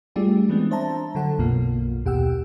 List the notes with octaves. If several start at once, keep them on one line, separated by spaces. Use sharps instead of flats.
G3 A3 D4 F4 G4 G#4
E3 G#3 B3 C4 D4
D4 C5 E5 A5 A#5
D3 F#3 A4 F#5
B1 F#2 B2 A#3 F4
D#2 B2 G4 F#5 G5 E6